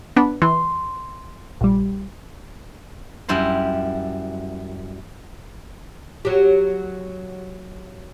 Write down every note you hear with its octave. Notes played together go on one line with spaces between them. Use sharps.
B3 D4 B4
E3 C6
A#1 G3
F#2 G3 E4 C6
F#3 G4